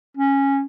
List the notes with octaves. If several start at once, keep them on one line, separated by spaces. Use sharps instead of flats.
C#4